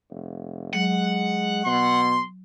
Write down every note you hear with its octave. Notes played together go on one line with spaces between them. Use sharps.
F1
F#3 G#3 F#5
B2 C6